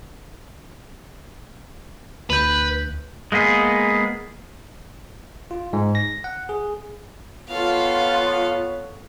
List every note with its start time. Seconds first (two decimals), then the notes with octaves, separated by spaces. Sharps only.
2.30 D2 B4 G6
3.32 G#3 A#3 B3 G#4
5.51 F4
5.73 G#2
5.95 A#6
6.24 F#5
6.49 G#4
7.49 B3 F4 A4 C#5 F5